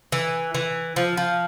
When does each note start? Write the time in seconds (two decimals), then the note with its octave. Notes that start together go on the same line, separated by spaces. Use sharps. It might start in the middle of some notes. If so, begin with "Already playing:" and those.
0.12 E3
0.55 E3
0.96 F3
1.17 F3